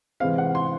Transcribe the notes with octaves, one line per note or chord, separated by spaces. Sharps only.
C3 E3 G#3 C4 F5
F#5
C6